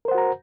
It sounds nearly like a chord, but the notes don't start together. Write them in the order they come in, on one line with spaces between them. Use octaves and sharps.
A#4 C5 F#5 F#4 A#5